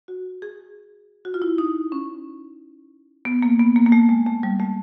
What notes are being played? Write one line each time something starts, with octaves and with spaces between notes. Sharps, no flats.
F#4
G#4
F#4
F4
E4
D#4
C#4
B3
A#3
B3
A#3
A#3
A3
G#3
A3
G3
A3